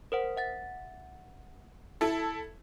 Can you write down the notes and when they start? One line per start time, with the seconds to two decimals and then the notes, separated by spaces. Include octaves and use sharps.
0.12 A#4 C5 F#5
0.36 E5 F#5 A6
2.01 E4 A4